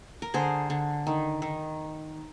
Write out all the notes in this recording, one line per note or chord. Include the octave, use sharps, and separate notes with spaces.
A#4
D3 G#4 C5
D3
D#3
D#3